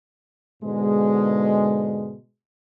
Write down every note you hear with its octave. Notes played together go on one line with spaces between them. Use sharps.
G#2 B2 D3 G#3